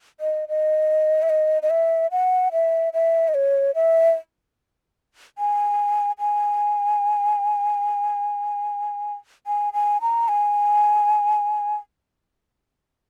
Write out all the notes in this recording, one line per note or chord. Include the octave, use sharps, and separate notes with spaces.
D#5
D#5
E5
D#5
D#5
E5
F#5
E5
E5
D#5
C#5
E5
G#5
G#5
G#5
G#5
A#5
G#5